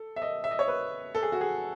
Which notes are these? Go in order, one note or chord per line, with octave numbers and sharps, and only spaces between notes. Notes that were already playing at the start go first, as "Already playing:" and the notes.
Already playing: A4
E5
D#5
E5
D#5
C#5
B4
A4
G#4
F#4
G#4